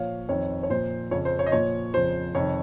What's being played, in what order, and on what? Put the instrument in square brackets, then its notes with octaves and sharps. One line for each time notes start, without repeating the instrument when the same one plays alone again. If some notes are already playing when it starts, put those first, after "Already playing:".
Already playing: [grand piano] A#2 F3 C#5 F5
F2 D#3 C#5
C#5
A#2 F3 C5
F2 C#3 F3 C#5
C5
C#5
D#5
A#2 F3 C#5
F2 C#3 F3 C5
F2 C3 D#3 C#5